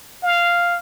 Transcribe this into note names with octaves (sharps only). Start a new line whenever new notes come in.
F5